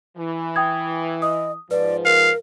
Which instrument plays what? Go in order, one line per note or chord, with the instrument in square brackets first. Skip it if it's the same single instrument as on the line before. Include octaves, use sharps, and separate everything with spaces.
[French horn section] E3
[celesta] G5 D#6 G#6
[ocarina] D#5 [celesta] D#6
[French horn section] G#2 F3 [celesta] B4 [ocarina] D5
[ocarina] A#4 [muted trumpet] F5